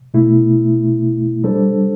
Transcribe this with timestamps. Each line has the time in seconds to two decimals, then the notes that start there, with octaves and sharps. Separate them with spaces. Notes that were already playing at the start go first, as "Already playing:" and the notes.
0.14 B2 A3 E4
1.44 G3 D4 A4 C5